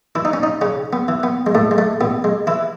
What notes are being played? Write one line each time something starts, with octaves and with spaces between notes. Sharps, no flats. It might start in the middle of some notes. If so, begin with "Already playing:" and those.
E3 E4
D#4
C#4
D#4
C#3 C#4
B3
E3
B3
G#3
A2 A3
G#3
A3
A1 B3
G#3
E3 E4